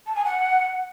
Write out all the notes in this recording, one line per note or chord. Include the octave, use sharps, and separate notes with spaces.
A5
G#5
F#5